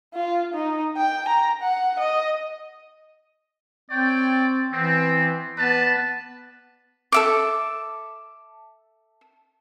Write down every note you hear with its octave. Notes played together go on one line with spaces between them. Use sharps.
F4
D#4
G5
A#5
F#5
D#5
C4 C#5 D5 G5
E3 B3 C4
B3 B4 D5 A5
A4 E5 D6